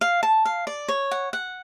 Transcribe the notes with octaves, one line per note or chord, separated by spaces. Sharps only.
F5
A5
F5
D5
C#5
F#5
F#5